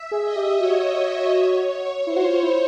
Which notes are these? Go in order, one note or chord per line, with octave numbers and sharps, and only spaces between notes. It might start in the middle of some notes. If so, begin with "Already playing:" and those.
Already playing: E5
G#4
D#5
G4
F#4 C#5
E4 C5
F#4
F4
E4